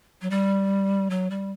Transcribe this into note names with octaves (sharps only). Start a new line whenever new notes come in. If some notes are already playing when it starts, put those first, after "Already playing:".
F#3
G3
F#3
G3